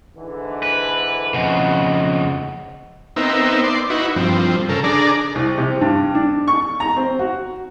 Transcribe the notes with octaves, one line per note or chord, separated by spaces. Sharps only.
G#2 D3 E3
B4
F2 C#3 D#5 F#5
B3 C4 D#4 A#4 E5
D5 C6
D#4 E4 F#4 B4
G2 F3 C4
C#3 A4 A#4
D4 G#4 D5 A#5
C2
C3
G2
D4
C#6
A#5
C4
F#4